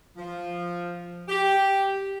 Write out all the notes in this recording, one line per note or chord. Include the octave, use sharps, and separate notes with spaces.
F3
G4